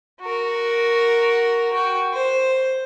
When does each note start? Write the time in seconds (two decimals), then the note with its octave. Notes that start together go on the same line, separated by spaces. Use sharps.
0.21 F#4 A#4
1.73 F#4 G5
2.13 C5